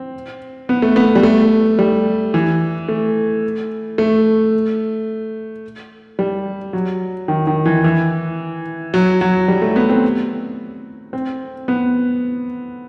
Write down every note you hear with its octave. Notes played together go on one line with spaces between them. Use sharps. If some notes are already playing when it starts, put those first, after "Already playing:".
Already playing: C4
B3
A3
B3
G3
A3
G3
E3
A3
A3
G3
F#3
D#3
D#3
E3
E3
F#3
F#3
G3
A3
B3
C4
C4
B3